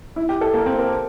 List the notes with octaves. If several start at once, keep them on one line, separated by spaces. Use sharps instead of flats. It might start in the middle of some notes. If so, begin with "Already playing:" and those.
E4
G4
A4
A#3
C4
A#4